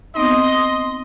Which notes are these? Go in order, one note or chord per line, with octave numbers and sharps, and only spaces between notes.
B3 C4 D#4 D#5 C6